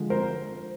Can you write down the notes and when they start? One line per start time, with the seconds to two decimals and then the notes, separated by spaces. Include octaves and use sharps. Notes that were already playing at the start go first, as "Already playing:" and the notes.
Already playing: D3 F3 G#3
0.10 A#4 C5